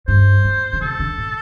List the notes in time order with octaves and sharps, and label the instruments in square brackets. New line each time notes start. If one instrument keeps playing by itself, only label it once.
[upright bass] G2 [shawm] C5
[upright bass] A2
D3
[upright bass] C3 [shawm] A4
[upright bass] D3
A2